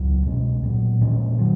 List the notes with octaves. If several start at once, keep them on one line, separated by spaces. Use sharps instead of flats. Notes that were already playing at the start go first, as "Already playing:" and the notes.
Already playing: C#2 F#3 B3
B2 G#3 C#4
A#2 F#3 B3
A#2 F3 G#3 C#4
D#3 F#3